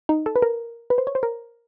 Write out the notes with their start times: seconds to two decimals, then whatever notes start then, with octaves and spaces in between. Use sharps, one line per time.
0.09 D#4
0.26 A4
0.36 B4
0.42 A#4
0.90 B4
0.98 C5
1.07 C#5
1.15 C5
1.23 A#4